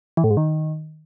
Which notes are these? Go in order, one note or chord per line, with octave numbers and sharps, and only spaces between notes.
E3
A2
G#2
D#3